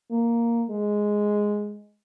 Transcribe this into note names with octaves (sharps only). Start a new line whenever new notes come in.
A#3
G#3